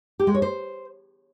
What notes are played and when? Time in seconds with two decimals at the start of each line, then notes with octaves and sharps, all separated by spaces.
0.20 G4
0.27 G#3
0.35 C#5
0.42 C5